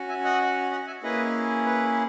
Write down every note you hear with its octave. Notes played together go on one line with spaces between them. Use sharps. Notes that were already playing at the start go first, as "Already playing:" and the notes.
Already playing: C#4 F#4
E5 G#5
D#5 F#5
D#5 F#5
E5 G#5
A#3 C#4 E4 G#4 B4 D#5
B4